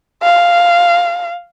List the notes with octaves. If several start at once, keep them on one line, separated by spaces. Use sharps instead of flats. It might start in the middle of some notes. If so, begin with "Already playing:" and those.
F5